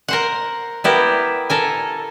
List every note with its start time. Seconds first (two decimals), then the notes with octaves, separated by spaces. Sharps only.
0.08 A#4 C5 F#5
0.84 B3 E4 G4 A#4
1.50 A4 A#4 G#5